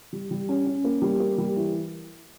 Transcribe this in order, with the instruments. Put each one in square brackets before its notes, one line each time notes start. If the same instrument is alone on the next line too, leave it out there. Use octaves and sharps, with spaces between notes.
[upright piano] G3
G3
C#4
C#4
A#3
G3
A#3
G3
E3